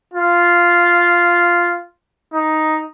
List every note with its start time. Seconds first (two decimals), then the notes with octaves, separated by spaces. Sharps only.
0.14 F4
2.34 D#4